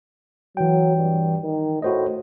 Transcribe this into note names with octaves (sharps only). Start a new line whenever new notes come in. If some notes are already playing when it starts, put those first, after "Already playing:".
E3 F#3 G5
G2
D#3
A2 F#4 C5 D#5